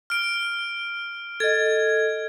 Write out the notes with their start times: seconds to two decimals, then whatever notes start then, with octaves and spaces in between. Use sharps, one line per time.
0.10 F6 D7
1.40 A4 D#5 G#6